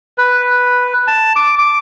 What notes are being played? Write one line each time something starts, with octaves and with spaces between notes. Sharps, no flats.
B4
A5
D6
D6